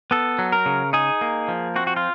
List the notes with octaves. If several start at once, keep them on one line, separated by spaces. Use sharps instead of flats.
B3 A4
F#3
A#4
C#3
D#4 G#4
A#3
F3
C4 F#4
F#4
F4